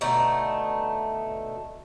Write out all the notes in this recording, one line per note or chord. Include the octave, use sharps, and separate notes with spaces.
B2 D3 A3 D#4